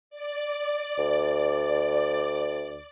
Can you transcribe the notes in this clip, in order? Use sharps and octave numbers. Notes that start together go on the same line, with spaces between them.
D5
D2